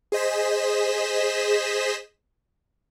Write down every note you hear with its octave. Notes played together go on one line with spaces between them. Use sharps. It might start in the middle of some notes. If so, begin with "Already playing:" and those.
G#4 C5 D#5 B6 E7